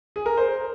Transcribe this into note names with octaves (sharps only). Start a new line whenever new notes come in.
G#4
A#4
C5